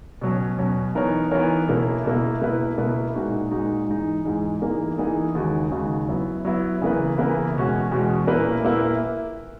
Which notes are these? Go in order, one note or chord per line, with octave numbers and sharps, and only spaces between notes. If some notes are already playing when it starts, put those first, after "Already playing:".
B2 F#3 C#4
B2 F#3 C#4
E3 B3 D#4 A#4 C#5
E3 B3 D#4 A#4 C#5
B2 A#3 E4
B2 A#3 E4
B2 A#3 E4 B4
B2 A#3 E4 B4
A#2 G#3 D#4 F#4
A#2 G#3 D#4 F#4
G#2 E3 G#3 D#4
G#2 E3 G#3 D#4
E3 A#3 D#4 G#4
E3 A#3 D#4 G#4
D#2 C#3 G#3 D#4 F#4
D#2 C#3 G#3 D#4 F#4
F#3 B3 E4
F#3 B3 E4
C#3 E3 A#3 E4 B4
C#3 E3 A#3 E4 B4
E2 B2 G#3 C#4 F#4
E2 B2 G#3 C#4 F#4
A#2 A#3 E4 B4
A#2 A#3 E4 B4